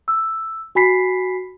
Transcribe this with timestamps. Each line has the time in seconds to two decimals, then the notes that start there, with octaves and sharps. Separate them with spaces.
0.08 E6
0.75 F#4 G#5 B5 B6 C7